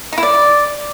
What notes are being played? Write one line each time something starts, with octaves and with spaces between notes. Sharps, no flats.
D#4
E4
D5